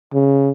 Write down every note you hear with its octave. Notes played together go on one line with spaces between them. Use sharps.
C#3